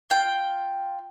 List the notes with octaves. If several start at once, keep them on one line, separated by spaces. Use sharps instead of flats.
F4 G5